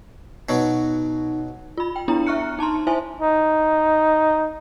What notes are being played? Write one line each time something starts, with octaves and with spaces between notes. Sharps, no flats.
B2 F#3 D#4
F4 B5
G5
B3 D4 E4 A#5
E5 C#6 F6 F#6 C#7
D#4 A5 A#5 C6
E4 C5 E5 G#5
D#4